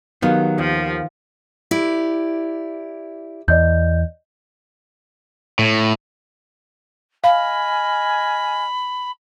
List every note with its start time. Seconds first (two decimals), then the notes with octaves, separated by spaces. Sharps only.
0.22 D#3 F#3 B3 G4 F5
0.58 D#2 F3
1.71 E4 G4 D5
3.48 E2 D5 D#5 G6
5.59 A2
7.24 D#5 F5 G#5 B5 F6